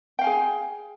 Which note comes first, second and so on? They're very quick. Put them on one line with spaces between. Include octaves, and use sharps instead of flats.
G5 F5 G#5 G#4